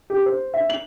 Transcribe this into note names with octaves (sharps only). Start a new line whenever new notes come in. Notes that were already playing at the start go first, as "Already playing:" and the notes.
G4
C5
E5
F#7